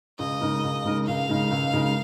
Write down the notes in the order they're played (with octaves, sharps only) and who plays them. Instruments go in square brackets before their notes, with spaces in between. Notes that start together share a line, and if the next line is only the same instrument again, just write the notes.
[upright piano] C#2 [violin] D#5
[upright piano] C#3 G#3 D#4 A#4
C#2
C#3 G#3 D#4 A#4
[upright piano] C#2 [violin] F5
[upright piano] C#3 G#3 D#4 A#4
C#2
C#3 G#3 D#4 A#4